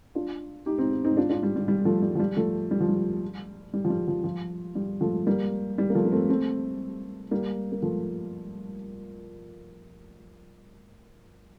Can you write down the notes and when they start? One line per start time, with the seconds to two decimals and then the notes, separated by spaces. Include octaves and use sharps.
0.15 D4 F4
0.66 D#4 G4
0.78 C4 D#4
1.05 C4 D#4
1.17 D4 F4
1.30 D4 F4
1.43 G3
1.56 G3
1.68 G3
1.85 F3 A3
2.02 G3
2.15 F3
2.20 G3
2.37 F3 A3
2.71 G3
2.80 F3
2.89 G3
3.74 G3
3.85 F3
3.90 G3
4.08 F3
4.24 F3
4.75 G3
5.01 F3 A3
5.26 G3 A#3
5.78 G3
5.90 A#3
5.95 F3 A3
6.05 A#3
6.11 A3 C4
6.29 A3 C4
7.31 G3 A#3
7.72 A#3
7.82 F3 A3